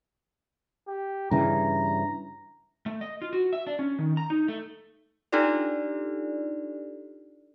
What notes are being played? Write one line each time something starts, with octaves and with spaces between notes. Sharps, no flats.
G4
G2 C#3 E3 A#5
A3
D#5
F4
F#4
E5
D4
C#4
D#3
A#5
D#4
A3
D4 D#4 F4 G4 A4 D5